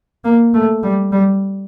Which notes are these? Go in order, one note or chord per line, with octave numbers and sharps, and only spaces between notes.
A#3
A3
G3
G3